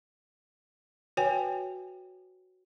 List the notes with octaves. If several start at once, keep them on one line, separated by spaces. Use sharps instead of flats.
F#4 B4 C#5 G5 G#5